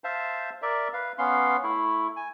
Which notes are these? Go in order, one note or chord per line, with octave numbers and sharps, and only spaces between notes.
C5 E5 F5 A5
A#4 D5 E5
B4 F5
B3 C#4 F5 C6
A3 E4
G#5